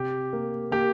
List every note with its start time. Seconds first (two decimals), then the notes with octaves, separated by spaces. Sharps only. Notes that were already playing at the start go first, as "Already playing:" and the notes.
Already playing: C3 G4
0.33 A#3
0.72 A#3 G4